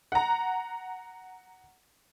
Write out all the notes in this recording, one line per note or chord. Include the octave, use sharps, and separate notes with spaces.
F#5 A#5